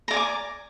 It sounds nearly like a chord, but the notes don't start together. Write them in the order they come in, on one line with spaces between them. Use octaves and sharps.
A#5 D5 G#5 D6